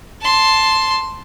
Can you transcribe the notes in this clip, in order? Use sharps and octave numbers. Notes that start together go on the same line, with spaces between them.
A5 C6